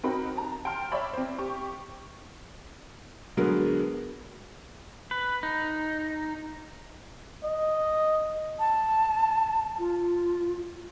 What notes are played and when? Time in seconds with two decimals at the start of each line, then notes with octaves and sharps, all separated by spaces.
0.03 C4 D#4 F#4 A#4 B5
0.37 A5 A#5
0.65 G5 A5 C6 F6
0.92 C#5 D5 E5 A5 B5
1.13 C4 C5
1.39 G4 C#6
3.37 D3 F#3 G#3 B3 A#4
5.11 B4
5.43 D#4
7.44 D#5
8.59 A5
9.79 F4